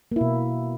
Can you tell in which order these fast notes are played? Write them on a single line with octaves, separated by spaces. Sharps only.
A#3 E4 B2